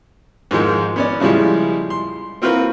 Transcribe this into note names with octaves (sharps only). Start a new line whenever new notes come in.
G#2 D#3 F3 G#3
B3 C#4 D5
A2 C#3 F3 G3 G#3
C6
A#3 C4 F4 F#4 A#4 B4